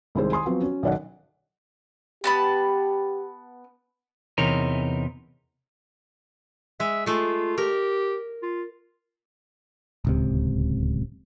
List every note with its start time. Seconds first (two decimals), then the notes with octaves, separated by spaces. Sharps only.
0.15 C2 D#3 G#3 E4 G#4 C5
0.32 G#5 C6 D#6
0.46 F3 F#3 B3 C4
0.61 C#4 F#4
0.83 B1 D#3 D5 D#5 F#5
2.24 B3 G4 A5 B5
4.38 E2 C3 E3 D#4 A#4 C#5
6.80 G#3 E5
7.06 G#3 A3 F4
7.58 G4 A#4
8.43 F4
10.05 D1 C#2 C3